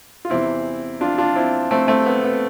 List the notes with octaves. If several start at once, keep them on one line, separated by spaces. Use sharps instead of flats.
F4
E2 C3 E3 C4 E4
D4 F4
D4 F4
C4 E4
A3 C4
A3 C4
B3
B3